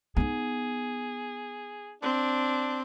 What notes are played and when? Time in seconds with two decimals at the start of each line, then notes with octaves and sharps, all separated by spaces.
0.17 B3 D#4 G#4
2.02 C4 D4